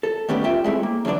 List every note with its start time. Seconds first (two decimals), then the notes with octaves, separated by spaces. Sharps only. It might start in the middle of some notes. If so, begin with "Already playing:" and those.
0.03 A4
0.28 D#3 G3 A3 B3 C#4 G4
0.44 F4 G4 E5 G5
0.64 G#3 A3 C4 E4
0.83 A#3
1.05 F#2 D3 E3 D4 D5